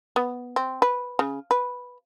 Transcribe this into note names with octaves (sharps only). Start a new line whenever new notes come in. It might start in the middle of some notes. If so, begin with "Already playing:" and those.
B3
C4
B4
C#3
B4